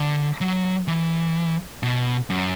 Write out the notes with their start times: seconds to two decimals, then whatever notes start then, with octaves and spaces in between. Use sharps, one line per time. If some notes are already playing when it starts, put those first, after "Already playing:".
Already playing: D3
0.41 F#3
0.88 E3
1.83 B2
2.30 F#2